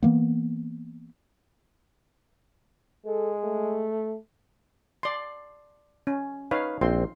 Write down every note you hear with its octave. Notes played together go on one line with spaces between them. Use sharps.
E3 A#3 B3
G#3 A4
A3
D5 C6
C#4
D#4 B4 C#5 F5
A#1 C4 C6